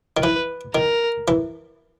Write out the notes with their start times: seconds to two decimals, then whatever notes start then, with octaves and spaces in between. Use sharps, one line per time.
0.17 D#3
0.22 E3 B4
0.75 D#3 A#4
1.28 E3